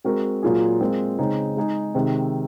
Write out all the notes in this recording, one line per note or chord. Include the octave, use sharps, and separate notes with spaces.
G#3 C4 F#4 A#4
A#2 F#3 A#3 F4 G#4
G#3 C4 F4 A#4
C#3 G#3 C4 D#4 G#4
G#3 D#4 G#4
C3 D#3 G#3 C4